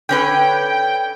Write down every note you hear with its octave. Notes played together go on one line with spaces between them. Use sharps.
D3 C#4 B4 G5